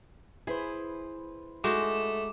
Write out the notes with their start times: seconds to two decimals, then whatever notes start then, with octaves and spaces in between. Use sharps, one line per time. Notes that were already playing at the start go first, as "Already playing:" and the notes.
0.47 E4 G#4 B4 C5
1.64 G#3 A3 D#4 F#4 D6 E7